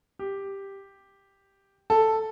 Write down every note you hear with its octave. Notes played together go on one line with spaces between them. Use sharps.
G4
A4